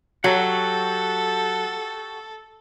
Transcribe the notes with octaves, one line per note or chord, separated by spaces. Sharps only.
F#3 F#4 G4 A4 F#5